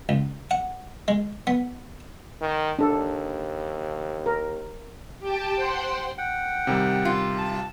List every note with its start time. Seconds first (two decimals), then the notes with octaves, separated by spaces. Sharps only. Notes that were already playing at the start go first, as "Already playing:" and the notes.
0.09 C#2
0.51 F#5
1.08 G#3
1.47 B3
2.41 D#3
2.79 D#2 D4 A4
4.26 A#4
5.20 G4 G5 A5
5.55 C5 F#5 G5 C6
6.18 F#5 G5
6.67 C3 D#3 G3
7.05 F4
7.38 A5